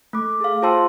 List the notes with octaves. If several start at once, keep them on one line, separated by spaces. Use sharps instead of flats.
A3 D6
G#4 F5
F4 C5 G5 A5 C6 E6